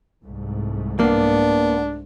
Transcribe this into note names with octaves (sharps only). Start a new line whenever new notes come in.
C2 G#2 A3
A#3 B3 D4